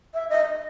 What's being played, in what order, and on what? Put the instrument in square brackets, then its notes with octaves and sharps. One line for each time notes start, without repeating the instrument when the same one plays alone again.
[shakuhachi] E5
D#5